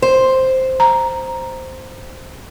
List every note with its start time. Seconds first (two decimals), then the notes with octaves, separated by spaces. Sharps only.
0.02 C5
0.80 A#5